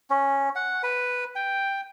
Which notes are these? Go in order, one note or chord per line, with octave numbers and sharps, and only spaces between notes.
C#4
F#5
B4
G5